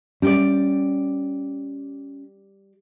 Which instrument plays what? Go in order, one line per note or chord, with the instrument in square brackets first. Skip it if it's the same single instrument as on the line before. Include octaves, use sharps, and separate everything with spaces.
[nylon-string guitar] G3 G4 D5 [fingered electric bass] C#4